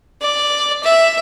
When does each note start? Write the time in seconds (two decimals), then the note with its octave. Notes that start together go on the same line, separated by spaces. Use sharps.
0.22 D5
0.83 E5